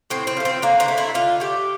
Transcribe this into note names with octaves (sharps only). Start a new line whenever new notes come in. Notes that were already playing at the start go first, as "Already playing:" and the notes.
A2 C4
C4
F3 A3
C4
D3 A#3
C4
A3
E4
D3 F4
A3 G4